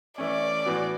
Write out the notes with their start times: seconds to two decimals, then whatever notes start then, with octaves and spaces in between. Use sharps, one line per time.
0.18 E3 A3 C#4 D5
0.66 A2 E3 B3 F#4